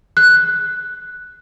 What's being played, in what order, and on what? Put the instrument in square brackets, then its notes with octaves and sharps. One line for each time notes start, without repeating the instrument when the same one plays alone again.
[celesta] F#6